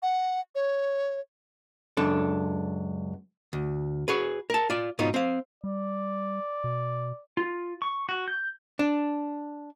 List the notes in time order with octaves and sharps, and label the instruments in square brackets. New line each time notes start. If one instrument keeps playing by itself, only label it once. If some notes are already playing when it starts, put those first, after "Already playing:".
[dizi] F#5
C#5
[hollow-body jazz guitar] C#2 F#2 D4 A4
D2
F#4 G#4 B4
A#4 A5
F4 D5
G#2 B2 D#4 F4
C4 F5
[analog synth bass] G3 [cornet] D5
[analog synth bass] B2
[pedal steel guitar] F4
C#6
F#4
G6
[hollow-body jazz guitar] D4